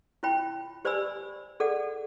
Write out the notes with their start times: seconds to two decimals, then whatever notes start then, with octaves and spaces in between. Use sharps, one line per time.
0.23 E4 F4 C#5 G5 B5
0.85 G4 C5 D5 G#5 B5 E6
1.60 G#4 A4 D5 F#5